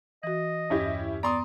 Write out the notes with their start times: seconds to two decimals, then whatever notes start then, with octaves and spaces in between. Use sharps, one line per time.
0.23 E3 F#4 D#5
0.70 E2 G2 C#4 E4 G4
1.23 B3 D5 A#5 C6 D#6